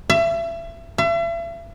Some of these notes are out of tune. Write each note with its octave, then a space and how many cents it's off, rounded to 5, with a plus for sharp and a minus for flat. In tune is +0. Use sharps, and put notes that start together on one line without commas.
E5 +30
E5 +40